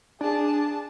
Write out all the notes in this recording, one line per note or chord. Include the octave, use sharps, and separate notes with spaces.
D4 G#4 A5